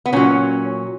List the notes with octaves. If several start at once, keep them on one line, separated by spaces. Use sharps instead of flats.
B3
A#2 F#3 C#4